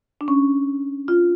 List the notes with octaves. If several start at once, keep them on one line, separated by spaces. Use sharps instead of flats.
D4
C#4
F4